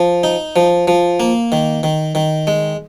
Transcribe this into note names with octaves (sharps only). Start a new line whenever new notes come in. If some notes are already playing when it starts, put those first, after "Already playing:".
Already playing: F3
D#4
F3
F3
A#3
D#3
D#3
D#3
G#3